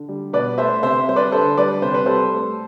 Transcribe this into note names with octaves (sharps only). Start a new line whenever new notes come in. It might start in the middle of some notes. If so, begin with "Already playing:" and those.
Already playing: D3
G3
B2 B4 D5
A3 C5 E5
C3 C5 E5
G3 C5
B4 D5
D3 A4 C5
G3 B4 D5
C3 C5
B4
G3 A4 C5
A3